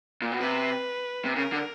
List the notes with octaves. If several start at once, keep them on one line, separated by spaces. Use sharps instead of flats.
A#2
B2
C3 B4
C3
C#3 A#4
D3